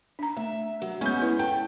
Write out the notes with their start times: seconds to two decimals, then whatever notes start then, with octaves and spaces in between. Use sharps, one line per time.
0.19 D4 A#5
0.37 A3 E5
0.82 F#3
1.01 G#3 B3 C#4 G#5 G6
1.22 E4 B4
1.39 A4 G5